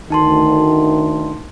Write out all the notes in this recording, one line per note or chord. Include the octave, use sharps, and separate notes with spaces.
D2 D#3 D#4 A5 C6